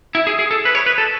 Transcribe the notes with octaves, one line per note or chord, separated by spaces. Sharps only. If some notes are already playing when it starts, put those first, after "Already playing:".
E4
G#4
G#4
A4
B4
C#5
B4
A4